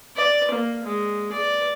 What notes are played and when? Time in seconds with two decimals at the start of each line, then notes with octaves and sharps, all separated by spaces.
0.16 D5
0.51 A#3
0.83 G#3
1.32 D5